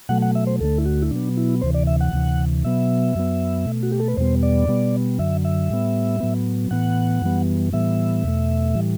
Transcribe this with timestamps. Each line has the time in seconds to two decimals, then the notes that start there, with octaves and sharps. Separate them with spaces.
0.09 B2 F#3 A3 F#5
0.22 F#5
0.35 E5
0.47 C5
0.61 D2 D3 A3 A4
0.78 E4
0.86 F#4
1.02 E4
1.11 B2 F#3 B3 D4
1.37 E4
1.61 D2 C3 E3 C5
1.74 D5
1.87 E5
2.01 F#5
2.13 D2 C3 E3
2.64 B2 F#3 B3 E5
3.15 F#2 F#3 B3
3.66 B2 A3
3.83 F#4
3.92 G4
4.00 A4
4.08 B4
4.17 E2 B2 G3 B3 C5
4.43 D5
4.68 B2 G3 B3
5.19 F#2 D3 F#3 E5
5.45 E5
5.70 A2 G3 B3
6.20 A2 F#3 B3
6.71 A2 E3 B3 F#5
7.22 F#2 E3 G3 B3
7.73 A2 E3 G3 B3 E5
8.24 E2 B2 A3
8.75 A2 E3 G3